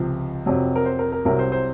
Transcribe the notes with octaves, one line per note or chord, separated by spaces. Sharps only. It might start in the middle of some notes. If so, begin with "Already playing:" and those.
Already playing: C#2 C3 F3
F2 C3 F#3
A#4
C5
A#4
A#4
C2 C3 F#3 A#4
C5
C5